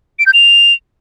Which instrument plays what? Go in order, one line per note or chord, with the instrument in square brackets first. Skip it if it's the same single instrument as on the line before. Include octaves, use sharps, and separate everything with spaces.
[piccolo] D7
G6
F7